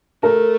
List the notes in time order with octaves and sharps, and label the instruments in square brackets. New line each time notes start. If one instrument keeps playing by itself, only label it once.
[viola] A3 [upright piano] A#4